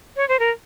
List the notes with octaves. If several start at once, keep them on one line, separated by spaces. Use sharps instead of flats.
C#5
C5
A#4